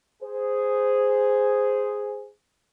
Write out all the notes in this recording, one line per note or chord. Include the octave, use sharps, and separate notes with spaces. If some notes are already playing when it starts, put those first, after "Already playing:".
G#4 C5